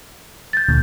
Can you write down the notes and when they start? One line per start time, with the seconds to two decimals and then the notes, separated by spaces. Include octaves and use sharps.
0.53 G6 A6
0.68 D2 A#2 D3